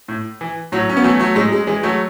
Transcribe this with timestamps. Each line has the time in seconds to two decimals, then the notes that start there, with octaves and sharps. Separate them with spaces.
0.08 A2
0.41 E3
0.72 A2 F#3
0.89 C#4
0.97 B3
1.03 E3 F#3 A3
1.19 F#3 A3
1.35 A2 G#3
1.52 G#3
1.67 E3 G#3
1.83 F#3 A3